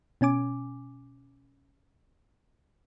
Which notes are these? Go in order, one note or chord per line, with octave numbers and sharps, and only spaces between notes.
B2 C#4 G#5 D6